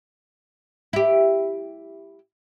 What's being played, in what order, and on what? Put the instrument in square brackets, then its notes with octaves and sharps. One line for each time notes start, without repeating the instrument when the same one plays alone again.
[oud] E4 G4